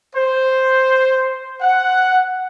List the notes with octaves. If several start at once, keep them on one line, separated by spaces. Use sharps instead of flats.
C5
F#5